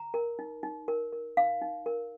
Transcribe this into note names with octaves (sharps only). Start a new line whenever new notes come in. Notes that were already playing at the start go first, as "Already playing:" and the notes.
Already playing: A#5
A#4
D#4
D#4
A#4
A#4
D#4 F5
D#4
A#4